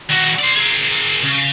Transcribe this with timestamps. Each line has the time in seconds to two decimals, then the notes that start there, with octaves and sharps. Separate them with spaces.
0.10 D#3 F#4
0.39 C5 D5
0.56 G#4 A#4
1.23 C#3